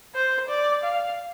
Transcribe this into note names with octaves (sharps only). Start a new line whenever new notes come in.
C5
D5
F5